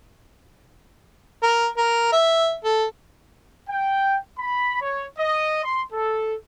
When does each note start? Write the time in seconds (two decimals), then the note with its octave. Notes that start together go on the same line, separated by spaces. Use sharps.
1.43 A#4
1.77 A#4
2.12 E5
2.64 A4
3.69 G5
4.38 B5
4.81 C#5
5.18 D#5
5.64 C6
5.93 A4